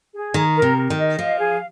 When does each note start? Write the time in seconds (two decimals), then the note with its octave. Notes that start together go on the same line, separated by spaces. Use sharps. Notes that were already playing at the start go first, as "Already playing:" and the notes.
0.14 G#4
0.34 D#3 A#5
0.56 A#4
0.62 C3
0.77 A#4
0.90 D#3
0.98 D#5
1.18 F3 F5
1.39 G#4